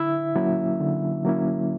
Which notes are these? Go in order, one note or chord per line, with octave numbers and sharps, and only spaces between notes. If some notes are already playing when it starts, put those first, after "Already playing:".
Already playing: D3 E4 E5
F#3 A#3 C#4 E4
D3
F#3 A#3 C#4 E4